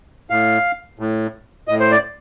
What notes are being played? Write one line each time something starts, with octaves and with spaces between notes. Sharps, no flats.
A2 F5
A2
A2 D#5
C5
D5